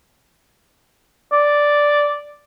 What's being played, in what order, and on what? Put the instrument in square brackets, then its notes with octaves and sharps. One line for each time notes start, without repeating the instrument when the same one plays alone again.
[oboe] D5